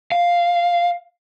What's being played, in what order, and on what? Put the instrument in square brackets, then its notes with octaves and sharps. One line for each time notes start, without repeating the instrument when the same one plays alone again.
[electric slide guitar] F5